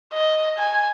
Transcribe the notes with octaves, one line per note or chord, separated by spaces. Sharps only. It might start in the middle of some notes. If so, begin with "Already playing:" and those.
D#5
G#5